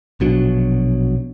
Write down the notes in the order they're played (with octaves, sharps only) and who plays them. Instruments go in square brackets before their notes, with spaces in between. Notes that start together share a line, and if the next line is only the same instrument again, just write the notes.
[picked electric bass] A#1 B2 F#3 D4